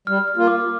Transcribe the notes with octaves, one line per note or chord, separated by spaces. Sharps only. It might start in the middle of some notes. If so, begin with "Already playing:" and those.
G3 F6
F6
A#3 F4
D6